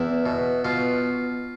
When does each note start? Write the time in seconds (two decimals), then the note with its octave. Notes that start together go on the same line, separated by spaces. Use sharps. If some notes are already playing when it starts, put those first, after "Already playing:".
Already playing: E2 E4
0.26 B2
0.64 B2 F4